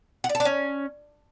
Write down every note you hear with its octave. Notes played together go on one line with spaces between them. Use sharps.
F#5
D5
A4
D4
C#4